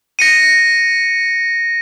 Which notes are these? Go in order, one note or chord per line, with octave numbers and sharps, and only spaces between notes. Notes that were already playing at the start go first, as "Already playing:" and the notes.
A#6 C#7 D#7